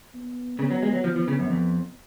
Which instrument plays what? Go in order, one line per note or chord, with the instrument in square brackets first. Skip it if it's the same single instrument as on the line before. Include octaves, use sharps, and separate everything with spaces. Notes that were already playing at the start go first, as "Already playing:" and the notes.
[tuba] B3
[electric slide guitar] C#3 [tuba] B3
[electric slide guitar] F#3
G#3
F#3
[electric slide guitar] F3 [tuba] B3
[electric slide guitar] F3
C#3
F#2
F2